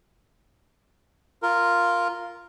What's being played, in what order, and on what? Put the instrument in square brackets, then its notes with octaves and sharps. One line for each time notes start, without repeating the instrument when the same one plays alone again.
[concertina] F4 A#4